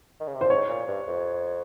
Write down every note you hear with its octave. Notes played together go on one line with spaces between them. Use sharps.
D#3
C#3
C3
A#2 C5
G#2 C#5
A#2
G2
F2